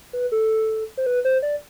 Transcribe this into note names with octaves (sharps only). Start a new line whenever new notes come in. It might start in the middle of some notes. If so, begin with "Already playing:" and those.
B4
A4
C5
B4
C5
D5